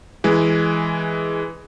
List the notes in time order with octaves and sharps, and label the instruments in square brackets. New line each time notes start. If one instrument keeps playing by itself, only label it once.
[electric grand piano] E3 G#3